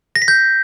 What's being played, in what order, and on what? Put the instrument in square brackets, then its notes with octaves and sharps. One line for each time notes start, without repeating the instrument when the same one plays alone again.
[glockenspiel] A#6
B6
G6